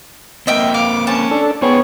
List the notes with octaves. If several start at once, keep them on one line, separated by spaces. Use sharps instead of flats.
A#3 C4 D#5 E5 G5
F5 D6
C#4 A5
D4 A4
B3 D#4 G#4 C5 C#5 G5